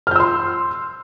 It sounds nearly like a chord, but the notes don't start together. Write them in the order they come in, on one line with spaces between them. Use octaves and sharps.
F6 G6 E6 C6